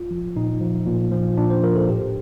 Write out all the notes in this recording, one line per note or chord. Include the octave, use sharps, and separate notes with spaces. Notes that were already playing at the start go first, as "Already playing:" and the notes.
Already playing: F4
F3
A#2 D#4
F3
A#2
F3
A#2 D4
C5
F3 A#4
A4
A2 G4